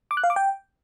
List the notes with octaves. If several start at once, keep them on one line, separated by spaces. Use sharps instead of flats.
D6
F#6
F5
D6
G5